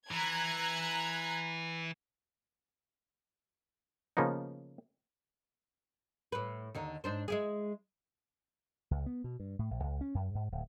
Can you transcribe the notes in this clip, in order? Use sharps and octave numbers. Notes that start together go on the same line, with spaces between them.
E3 A#5 F#6 G#6
C#3 F3 A#3 B3 D#4
A2 B4
D#2 D3 D#4
G#2 D4 C5
G#3 E4 G#4
C#2
B3
B2
G2
A2
A#1
C#2
C#4
F#2
G#2
D1